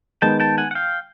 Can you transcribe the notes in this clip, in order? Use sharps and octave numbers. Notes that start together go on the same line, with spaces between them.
D#3 G#3 B3 G5 A5
G5 A5
F#5 G#5
F#5
F5 G5